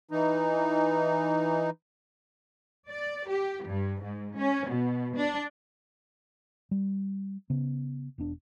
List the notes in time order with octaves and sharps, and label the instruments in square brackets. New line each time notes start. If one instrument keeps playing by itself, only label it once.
[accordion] E3 D#4
[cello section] D5
G4
G2
G#2
C#4
B2
D4
[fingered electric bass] G3
C#3 B3
E1 B3 D4